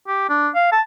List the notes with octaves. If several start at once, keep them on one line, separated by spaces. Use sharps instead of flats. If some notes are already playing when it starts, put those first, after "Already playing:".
G4
D4
F5
A5